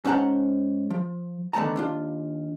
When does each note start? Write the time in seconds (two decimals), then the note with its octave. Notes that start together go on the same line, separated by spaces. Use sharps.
0.05 G#2 C#4 C5 F#5 A5 A#5
0.90 F3
1.53 D3 D#3 A3 B3 A5 A#5
1.76 D#2 D4 F4